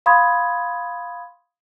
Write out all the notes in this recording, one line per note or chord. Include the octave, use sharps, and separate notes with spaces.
F5 B5 C6 D#6 G#6